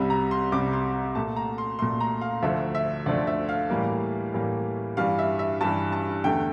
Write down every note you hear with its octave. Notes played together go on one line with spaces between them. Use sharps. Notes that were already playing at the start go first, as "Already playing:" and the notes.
Already playing: C2 C3 G3
A#5
C6
C2 C3 G3 D6
C6
A#2 A3 A5
A#5
C6
A#2 A3 C6
A#5
F5
D2 D3 F3 A3 E5
E5
D2 D3 F3 A3 D5
E5
F5
A2 E3 G3 A#3
A2 E3 G3 A#3
G2 E3 G3 F5
E5
E5
G2 E3 G3 A5
A5
E2 D3 A3 G5